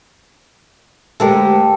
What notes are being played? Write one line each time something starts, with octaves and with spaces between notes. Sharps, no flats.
D2 G#3 G4 A4 A#4